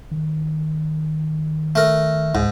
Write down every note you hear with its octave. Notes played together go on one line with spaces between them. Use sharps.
D#3
A3 A#4
C#2 G#2